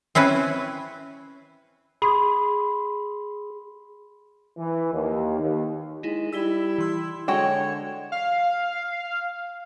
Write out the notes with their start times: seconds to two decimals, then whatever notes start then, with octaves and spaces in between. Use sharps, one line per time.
0.15 C4 C#4 E4 B4
2.02 G#4 B5 C6
4.57 E3
4.93 D#2
5.39 D#2
6.03 G#3 D#4 E4
6.33 G3 E4 E6 B6 G7
6.78 E3 C6 E6
7.28 D3 G#3 F#4 C#5 G5 E7
8.12 F5